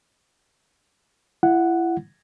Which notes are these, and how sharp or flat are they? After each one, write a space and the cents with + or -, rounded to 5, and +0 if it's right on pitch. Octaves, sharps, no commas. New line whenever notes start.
E4 +30 F#5 +0